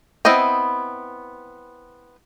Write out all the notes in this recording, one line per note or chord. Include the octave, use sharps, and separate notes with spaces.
B3 C4 E4 D#5 G5